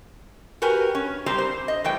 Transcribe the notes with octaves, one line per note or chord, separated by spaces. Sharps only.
F#4 G4 A#4 B4 G#5
C#4
G3 C4 G4 C5 A#5
C5
D#5
A2 E3 G3 G5